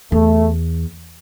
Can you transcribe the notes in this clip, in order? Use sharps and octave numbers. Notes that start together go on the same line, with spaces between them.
E2 A3